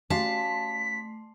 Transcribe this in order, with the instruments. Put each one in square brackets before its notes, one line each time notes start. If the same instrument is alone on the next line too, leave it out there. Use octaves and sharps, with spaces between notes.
[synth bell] A3 C6 C7 [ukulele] C#4 F#4 F5 [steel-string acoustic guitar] A5 [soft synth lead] B6